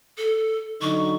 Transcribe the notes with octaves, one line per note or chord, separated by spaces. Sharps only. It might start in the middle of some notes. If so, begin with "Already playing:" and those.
A4
D3 F#3 D#4 C#6